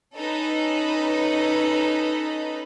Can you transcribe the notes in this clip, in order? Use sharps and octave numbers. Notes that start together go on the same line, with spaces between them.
C#4 D#4 A4 B4